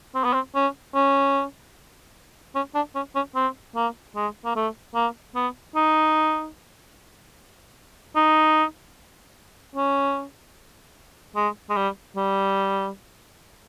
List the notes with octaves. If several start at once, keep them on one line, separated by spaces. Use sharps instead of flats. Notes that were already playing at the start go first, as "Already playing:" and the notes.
C4
B3
C4
C#4
C#4
C#4
D4
C#4
C#4
C4
A#3
G#3
A#3
A3
A#3
B3
D#4
D#4
C#4
G#3
G#3
G3
G3